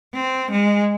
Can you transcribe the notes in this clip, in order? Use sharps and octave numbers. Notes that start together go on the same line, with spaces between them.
C4
G#3